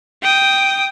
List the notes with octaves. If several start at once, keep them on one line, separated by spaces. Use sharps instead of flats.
G5 D#6